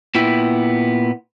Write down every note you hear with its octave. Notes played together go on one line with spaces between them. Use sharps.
A#2 B3 E4 G5